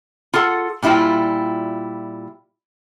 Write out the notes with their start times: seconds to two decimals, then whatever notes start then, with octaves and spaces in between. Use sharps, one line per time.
0.34 F4 G#4 A4 F#5
0.82 A#2 G3 E4 F4 G5